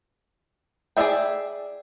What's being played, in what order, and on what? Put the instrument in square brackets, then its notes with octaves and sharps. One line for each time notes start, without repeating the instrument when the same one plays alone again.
[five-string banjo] G#4 A4 D5 E5 G5